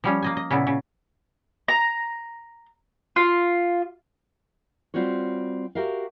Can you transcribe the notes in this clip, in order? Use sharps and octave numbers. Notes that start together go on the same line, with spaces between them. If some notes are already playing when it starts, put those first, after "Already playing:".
F3 G3 C#4
A#3 D#5 G#5
D#5
A#2 C#3 B3 E4
C#3
A#5
F4
G3 C4 F4 F#4 C#5
F#4 G4 A#4 E5 F5